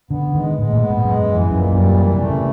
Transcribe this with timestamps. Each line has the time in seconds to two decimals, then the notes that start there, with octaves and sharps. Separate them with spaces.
0.10 D3 B3
0.34 D#3 G#3
0.58 A2 G#3
0.73 A#2
0.81 B3
0.89 G#2
1.04 F#2 G#3
1.28 E3
1.36 F#2
1.50 F#2 A#2
1.74 F#2 G3
1.97 E3
2.13 C3
2.21 A3
2.29 C#3